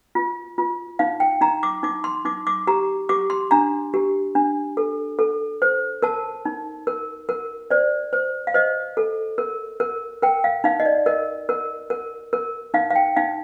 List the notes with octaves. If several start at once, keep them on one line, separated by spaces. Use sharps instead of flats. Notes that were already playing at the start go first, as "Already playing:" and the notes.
F4
F4
D#4 F5
G5
D#4 A#5
D6
D#4 D6
C6
D#4 D6
D6
G4 A#5
G4 D6
C6
D4 A#5
G4
D4
A4
A4
C5
A#4 A5
D#4
A#4
A#4
C5 D5
C5
F5
C5 D#5
A4
A#4
A#4
A#4 G5
F5
D#4 F5
D#5
D5
A#4 D#5
A#4
A#4
A#4
D#4 F5
F5
G5
D#4 F5